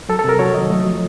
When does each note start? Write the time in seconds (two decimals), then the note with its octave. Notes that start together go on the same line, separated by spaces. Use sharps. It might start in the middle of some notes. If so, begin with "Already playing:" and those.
0.09 F#3 A4
0.19 A4
0.24 C3 A#4
0.39 F#3 C#5
0.54 D#3 D#5
0.70 A3
0.86 F3